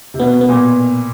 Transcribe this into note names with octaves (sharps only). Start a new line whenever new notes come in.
C3
B2 B3
B3
A#2